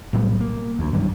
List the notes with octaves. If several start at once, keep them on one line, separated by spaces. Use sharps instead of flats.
B1 A2 G3 B3
A#3
D2
B1 G2 D#3 E3